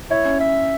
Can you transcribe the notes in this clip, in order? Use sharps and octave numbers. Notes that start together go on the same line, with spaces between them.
E4 C#5
C#4
E5